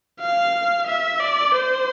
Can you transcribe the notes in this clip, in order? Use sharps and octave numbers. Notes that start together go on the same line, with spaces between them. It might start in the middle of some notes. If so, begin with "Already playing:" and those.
F5
E5
D5
C5